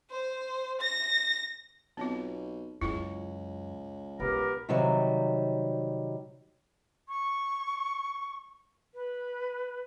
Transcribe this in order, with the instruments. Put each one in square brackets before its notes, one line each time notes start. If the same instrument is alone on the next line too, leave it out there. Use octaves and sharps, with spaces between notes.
[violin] C5
A#6
[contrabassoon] B1 [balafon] B3 C4 F4
[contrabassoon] C#2 [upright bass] F#2 [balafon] E4 F4 G#4
[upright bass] B1 [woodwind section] B3 G4 A#4
[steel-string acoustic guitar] C3 D#3 F#3 G3
[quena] C#6
B4